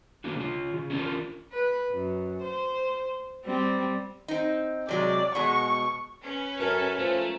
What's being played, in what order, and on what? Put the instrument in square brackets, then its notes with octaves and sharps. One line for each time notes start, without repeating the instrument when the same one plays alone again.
[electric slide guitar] A#3 D4 F#4
C#3 F4
C#3
C#4 D4 F4 G#4 A#4
[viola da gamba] B4
F#2
C5
G3 C4
[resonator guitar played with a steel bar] C4 D#4
[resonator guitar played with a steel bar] C3 F#3 G#3 [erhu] D5
[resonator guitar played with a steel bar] B2 G#3 [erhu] C#6
[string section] C#4 B4
[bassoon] F#2 [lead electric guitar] A4 [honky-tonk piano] A#4
[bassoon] F3 [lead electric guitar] A3